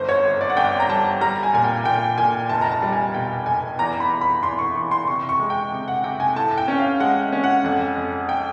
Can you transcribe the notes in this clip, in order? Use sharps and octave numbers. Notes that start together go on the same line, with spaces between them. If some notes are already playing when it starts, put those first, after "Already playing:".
Already playing: G1 C5
C#5
G1
D5
F#5
G1 G5
A#5
G3 A5
G3 A#5
G#5
A#2 G#5
G5
A#2 G5
A#2 G#5
F1 A5
A#5
A5
G3
G#5
B2 G5
F1 G#5
E2 A#5
B5
E2
B5
E2 C6
C#6
E3 C#6
C6
C3 C#6
C#6
G#3
G5
C3
F#5
C3 G5
G#5
A2 A5
G5
C#4
F5
G#3 F#5
C#4
F#5
F2 F#5
F2
G5